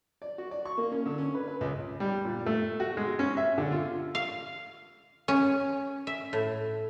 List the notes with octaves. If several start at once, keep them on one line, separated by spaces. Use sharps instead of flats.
D5
F#4
D5
C#6
A#3
C#4
D3
C#4
B4
B4
C#2
G3
A#2
A3
F#4
G#3
C#4
E5
D3
F4
F5
C#4
E5
A2